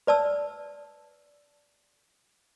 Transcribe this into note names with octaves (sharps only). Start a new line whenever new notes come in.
B4 D5 A5 E6